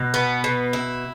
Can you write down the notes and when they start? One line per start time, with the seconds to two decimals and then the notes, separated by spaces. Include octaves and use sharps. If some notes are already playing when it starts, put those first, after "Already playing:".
Already playing: B2
0.14 B3
0.44 B2
0.73 E4